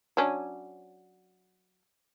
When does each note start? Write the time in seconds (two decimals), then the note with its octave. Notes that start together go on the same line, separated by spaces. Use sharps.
0.17 F#3 C#4 D4